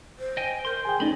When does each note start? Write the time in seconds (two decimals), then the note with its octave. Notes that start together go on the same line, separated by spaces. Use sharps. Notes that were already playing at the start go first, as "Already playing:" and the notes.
0.19 C5
0.37 D#5 G5 G#5
0.65 A#4 C6 G6
0.85 G#4 G5 G#5
1.00 A3 C#4 D#4 G#4 D5 D#5 B5